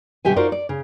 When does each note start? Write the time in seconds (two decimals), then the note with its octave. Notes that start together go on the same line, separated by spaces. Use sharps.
0.25 B2 D3 G3 G4 E5 G#5
0.36 D#4 F4 F#4 A#4 C5 D5
0.52 D5
0.69 C#3